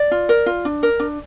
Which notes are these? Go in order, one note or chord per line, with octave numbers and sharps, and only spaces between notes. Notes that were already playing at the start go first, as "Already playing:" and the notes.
Already playing: D5
F4
A#4
F4
D4
A#4
D4